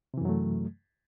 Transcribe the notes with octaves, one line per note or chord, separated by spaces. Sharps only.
F#2 C3 E3 F#3 A3